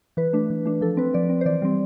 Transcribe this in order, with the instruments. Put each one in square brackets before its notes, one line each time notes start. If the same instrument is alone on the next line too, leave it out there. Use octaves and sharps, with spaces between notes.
[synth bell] E3 B4
A3 D4
E3
A3 D4
F3 A4
C4 B4
F3 D5
C4
C5
E3 D5
G3 C4